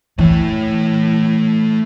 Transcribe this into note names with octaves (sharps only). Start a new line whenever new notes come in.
E3 A3 C#5